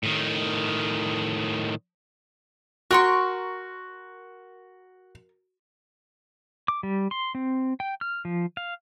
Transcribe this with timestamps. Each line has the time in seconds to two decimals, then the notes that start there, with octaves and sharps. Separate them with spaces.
0.03 A2 D#3
2.91 F#4 A#4 C6 C#6
6.68 D6
6.83 G3
7.11 C6
7.35 C4
7.80 G5
8.01 F6
8.25 F3
8.57 F5